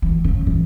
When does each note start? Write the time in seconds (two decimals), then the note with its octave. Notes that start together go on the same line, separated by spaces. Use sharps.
0.02 E3
0.24 C#3
0.47 E3